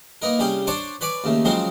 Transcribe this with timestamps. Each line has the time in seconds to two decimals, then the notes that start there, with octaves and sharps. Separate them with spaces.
0.22 A#3 B3 D#4 A#4
0.39 C2 G3 C#4 G#4 G5
0.67 D4 C5 C#5 A5 C#6 D6
1.01 B4 C#5 D5 G#5 D6
1.24 D#2 C#3 A3
1.45 C#3 F3 F#3 G#3 C4 C5